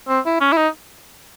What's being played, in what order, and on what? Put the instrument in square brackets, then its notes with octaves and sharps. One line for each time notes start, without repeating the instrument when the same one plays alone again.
[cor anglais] C4
E4
C#4
E4
D#4